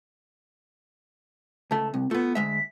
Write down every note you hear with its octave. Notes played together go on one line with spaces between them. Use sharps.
C#2 A3 A5
C2 C4
A3 B3 F4
D2 G#3 E5 B6